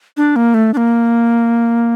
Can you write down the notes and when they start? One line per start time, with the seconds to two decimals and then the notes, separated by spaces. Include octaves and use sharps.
0.17 D4
0.36 A#3
0.54 A3
0.74 D4
0.77 A#3